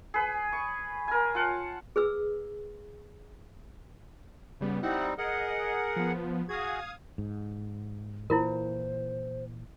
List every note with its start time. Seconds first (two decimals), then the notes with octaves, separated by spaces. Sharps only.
0.14 G#4 B4
0.53 C#6
1.08 A#4 G#5
1.35 F4 F#5 A5
1.96 G#4 B4 E6
4.61 C#3 G3 B3
4.83 G3 C4 D#4 E4 F#5
5.18 G#4 A#4 D#5 F#5
5.96 F3 B3
6.49 F#4 G#4 F5 D#6 G#6
7.18 G#2
8.30 A#2 E3 E4 F4 A#4 C5